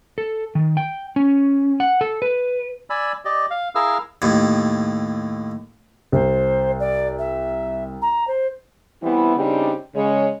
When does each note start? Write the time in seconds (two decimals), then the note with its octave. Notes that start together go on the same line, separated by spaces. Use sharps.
0.18 A4
0.55 D#3
0.77 G5
1.16 C#4
1.80 F#5
2.01 A4
2.22 B4
2.90 D5 G#5 B5 E6
3.25 G4 D5 D#5
3.50 F5
3.75 E4 G#4 A#4 F5 E6 F6
4.22 D#2 A2
6.12 C2 C5
6.79 D5
7.18 E5
8.01 A#5
8.27 C5
9.03 E3 G3 B3 C4 E4
9.37 C#3 G3 C4 D4 D#4 G4
9.95 C#3 G#3 C#5